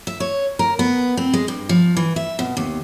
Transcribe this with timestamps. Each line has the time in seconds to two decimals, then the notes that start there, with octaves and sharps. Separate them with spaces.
0.07 E5
0.20 C#5
0.59 A#4
0.79 B3
1.17 C4
1.33 G#3
1.48 G2
1.69 F3
1.97 E3
2.16 E5
2.39 B2
2.57 D#2